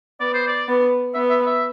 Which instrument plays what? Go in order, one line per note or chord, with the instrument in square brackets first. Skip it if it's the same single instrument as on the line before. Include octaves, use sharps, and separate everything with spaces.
[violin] B3 [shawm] D5
[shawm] C5
D5
[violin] B3
[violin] B3 [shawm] E5
[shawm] E5
E5